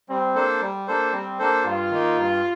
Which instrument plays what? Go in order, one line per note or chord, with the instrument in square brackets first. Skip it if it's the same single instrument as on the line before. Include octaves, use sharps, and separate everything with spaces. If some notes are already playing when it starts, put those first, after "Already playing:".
[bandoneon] G3 [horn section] C4
[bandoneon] A#3 D4 A4 C5
G3
A#3 D4 A4 C5
[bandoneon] G3 [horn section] C4
[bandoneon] A#3 D4 A4 C5
[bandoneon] G2 [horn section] F4
[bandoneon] D#3 A#3 D#4
G2